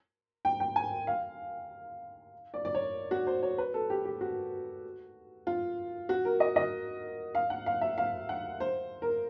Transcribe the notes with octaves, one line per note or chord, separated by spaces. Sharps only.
G5
G5
G#5
F5
D5
D5
C#5
F#4
C5
C#5
B4
A4
G4
G4
F#4
F4
F#4
A#4
D#5
D#5
F5
F#5
F5
E5
F5
F#5
C5
A#4